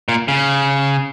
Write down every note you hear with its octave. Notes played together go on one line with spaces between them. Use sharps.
A#2
C#3